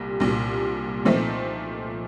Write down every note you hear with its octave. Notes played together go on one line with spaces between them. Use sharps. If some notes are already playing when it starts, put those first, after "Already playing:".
Already playing: C2 A#2 G3
C2 A#2 G3
A#2 F3 A3 C4 D#4